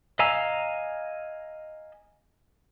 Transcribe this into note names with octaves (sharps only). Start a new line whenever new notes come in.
D#5 F5 G#5 A#5 E6